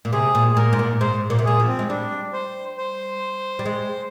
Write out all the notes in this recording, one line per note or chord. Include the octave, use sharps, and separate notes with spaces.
A#2
C3 G#4
A#2
G#4
A#2 A#4
G#2
A#2
G#2 C5
A#2
C3
A#2 G#4
F3
C4
G#3
G3 D4
C5
C5
G3
G#3